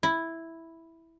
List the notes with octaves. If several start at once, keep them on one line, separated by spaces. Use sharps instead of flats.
E4